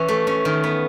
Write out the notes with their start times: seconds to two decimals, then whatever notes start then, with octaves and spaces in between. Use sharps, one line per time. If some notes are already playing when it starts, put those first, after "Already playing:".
Already playing: E3 C#4
0.08 A3
0.27 C#4
0.45 D#3
0.64 B3